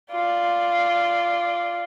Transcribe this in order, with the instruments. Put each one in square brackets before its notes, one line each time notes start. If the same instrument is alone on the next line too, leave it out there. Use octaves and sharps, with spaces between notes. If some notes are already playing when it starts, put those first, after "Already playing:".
[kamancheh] F4 D5